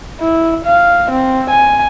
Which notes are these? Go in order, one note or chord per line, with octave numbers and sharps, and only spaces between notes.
E4
F5
C4
G#5